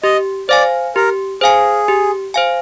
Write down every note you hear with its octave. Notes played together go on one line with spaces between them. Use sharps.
G4 D#5
C5 D5 F5 G#5
G4 A#4
G#4 C5 F5 G#5
G4
C5 F5 G#5